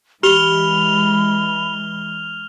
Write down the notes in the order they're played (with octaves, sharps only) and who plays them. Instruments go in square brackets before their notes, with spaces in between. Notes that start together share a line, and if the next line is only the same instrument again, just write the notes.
[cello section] E3 G#3 [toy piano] G4 [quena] B5 [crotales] F6 F7 G7